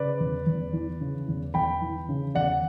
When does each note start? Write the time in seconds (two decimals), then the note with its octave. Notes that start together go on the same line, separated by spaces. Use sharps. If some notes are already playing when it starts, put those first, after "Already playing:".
Already playing: C#3 B4 D5
0.20 E2
0.47 E2
0.73 E3
1.01 C#3
1.28 E2
1.54 E2 G5 B5
1.82 E3
2.09 C#3
2.35 E2 D5 F#5